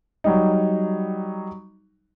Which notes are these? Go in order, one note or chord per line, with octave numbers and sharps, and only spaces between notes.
F#3 G3 D#4